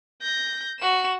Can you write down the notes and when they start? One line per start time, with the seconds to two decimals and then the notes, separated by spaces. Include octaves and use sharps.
0.22 G6 A#6
0.79 F#4 E7